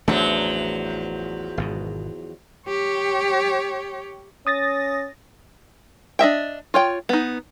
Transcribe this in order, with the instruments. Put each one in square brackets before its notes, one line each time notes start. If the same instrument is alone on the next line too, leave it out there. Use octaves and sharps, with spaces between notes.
[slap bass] A1 A3 D4 [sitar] E2 F3 F#3
[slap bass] G#1 G#2 B2
[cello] G4 C#5
[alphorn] C#4 [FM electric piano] D#6 A6 A#6
[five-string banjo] D4 D#5 E5 G5
F4 C#5 G5
B3 D#4